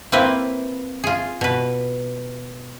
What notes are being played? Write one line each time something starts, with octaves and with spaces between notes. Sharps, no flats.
A#3 C4 E4 B4
F4 G#4
B2 B4